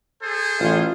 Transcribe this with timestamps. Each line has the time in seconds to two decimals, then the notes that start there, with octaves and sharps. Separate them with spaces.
0.22 G#4 A4 C5
0.60 A1 F4